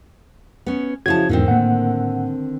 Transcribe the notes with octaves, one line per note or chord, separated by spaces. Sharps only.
B3 C#4
C#3 F3 E4 F#4 A5 G#6
E2 G#2 D3 D#3 C4
A2 A#3 F#5